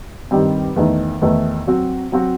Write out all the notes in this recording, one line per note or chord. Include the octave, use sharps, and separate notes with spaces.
G2 D#3 G3 C4
E2 D#3 A3 D#4
E2 D#3 A3 D#4
F#3 C4 F#4
F#3 C4 F#4